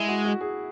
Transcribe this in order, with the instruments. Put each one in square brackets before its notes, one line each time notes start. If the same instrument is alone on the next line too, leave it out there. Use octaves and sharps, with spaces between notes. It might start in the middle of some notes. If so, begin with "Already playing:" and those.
Already playing: [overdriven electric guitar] G#3 [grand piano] E4
[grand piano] F#4
F#4
G#4